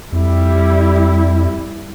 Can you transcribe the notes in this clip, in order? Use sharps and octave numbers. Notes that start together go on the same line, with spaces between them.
F2 G3 E4